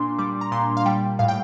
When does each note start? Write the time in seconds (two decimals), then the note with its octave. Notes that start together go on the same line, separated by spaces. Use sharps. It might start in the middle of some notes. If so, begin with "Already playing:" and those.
Already playing: A#2 D4 C6 D6
0.19 G3 D6
0.41 A#5
0.52 A#2 C6
0.77 F5
0.86 G3 G5
1.19 A2 F5
1.28 G5